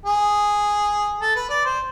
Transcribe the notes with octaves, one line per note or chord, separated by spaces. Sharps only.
G#4
A4
B4
D5
C5